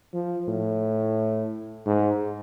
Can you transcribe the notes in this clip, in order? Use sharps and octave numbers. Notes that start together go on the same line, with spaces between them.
F3
A2
G#2